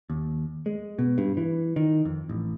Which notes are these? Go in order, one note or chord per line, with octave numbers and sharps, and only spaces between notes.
D#2
G#3
B2
G2
E3
D#3
F2
A1